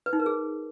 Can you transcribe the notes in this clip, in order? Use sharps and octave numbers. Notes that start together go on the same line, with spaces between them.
B4
D#4
A#4
G#4